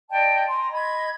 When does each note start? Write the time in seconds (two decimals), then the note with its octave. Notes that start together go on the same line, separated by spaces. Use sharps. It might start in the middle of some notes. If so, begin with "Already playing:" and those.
0.10 D5 D#5 G5 A5
0.47 G#5 A#5 C6
0.71 D#5 B5 G#6